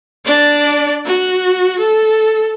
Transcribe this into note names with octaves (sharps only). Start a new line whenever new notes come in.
D4 D5
F#4
A4